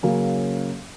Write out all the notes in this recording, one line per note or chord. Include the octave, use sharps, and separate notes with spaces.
C#3 F#3 A#3 C#4